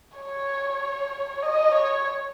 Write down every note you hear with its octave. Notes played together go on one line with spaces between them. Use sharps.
C#5
D#5
C#5